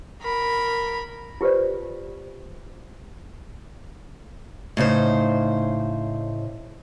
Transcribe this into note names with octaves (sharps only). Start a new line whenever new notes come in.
A#4 B5
F4 G4 B4 C5 D5
A2 C#3 D#4 C5